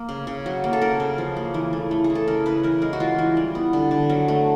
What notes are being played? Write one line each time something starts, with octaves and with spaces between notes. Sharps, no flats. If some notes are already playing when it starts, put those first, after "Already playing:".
Already playing: A#3
C#3
C#3
F#3
A#3
A4
C#3 A#4
C#3
F3
A#3
E3
A3
A3
G#4
E3
A4
C#3 A#4
C#3 B4
E3 A#4
G#3 A#4
F#4
E3 F4
E3
G3
B3
D3
D3
F#3
A3